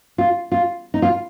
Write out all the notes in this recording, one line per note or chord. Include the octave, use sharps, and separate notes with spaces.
F4
F4
D#4
F4